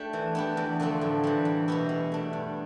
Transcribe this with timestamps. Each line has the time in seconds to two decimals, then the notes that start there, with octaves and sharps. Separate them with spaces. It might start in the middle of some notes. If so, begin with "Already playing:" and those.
Already playing: A3 D4 G4
0.13 E3
0.35 B3 D4 G4
0.57 E2
0.80 D3 F3 A3 C4
1.01 A2
1.24 E3 G3
1.45 E2
1.68 B2 B3 E4 G4
1.89 B2
2.12 A3 D4
2.33 G2